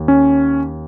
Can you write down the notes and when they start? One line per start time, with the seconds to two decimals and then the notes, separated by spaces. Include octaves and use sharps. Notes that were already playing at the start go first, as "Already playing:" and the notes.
Already playing: D#2
0.08 C#4